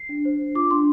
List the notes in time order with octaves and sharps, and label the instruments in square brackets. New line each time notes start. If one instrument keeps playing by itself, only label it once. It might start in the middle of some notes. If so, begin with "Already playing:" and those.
Already playing: [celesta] C7
D4
C5
D4
F4 D6
D4 C6